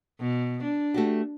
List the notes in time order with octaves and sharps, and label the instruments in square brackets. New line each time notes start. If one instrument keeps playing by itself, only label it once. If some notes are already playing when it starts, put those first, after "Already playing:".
[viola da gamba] B2
D4
[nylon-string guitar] A3 F#4 G4